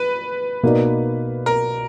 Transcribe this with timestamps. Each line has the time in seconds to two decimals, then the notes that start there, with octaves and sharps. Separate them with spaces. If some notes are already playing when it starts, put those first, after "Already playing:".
Already playing: B4
0.63 B2 A#3 D#4 F#4 D5
1.46 A#4